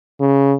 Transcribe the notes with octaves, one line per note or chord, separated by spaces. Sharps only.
C#3